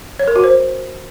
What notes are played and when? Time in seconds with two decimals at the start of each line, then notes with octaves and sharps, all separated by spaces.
0.19 C#5
0.27 A#4
0.36 F#4
0.44 C5